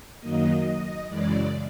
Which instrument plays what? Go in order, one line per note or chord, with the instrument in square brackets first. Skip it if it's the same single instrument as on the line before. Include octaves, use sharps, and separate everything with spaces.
[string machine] F#2 D#3 F#3 A#3 D#5
F#2 C#3 E3 G#3 D5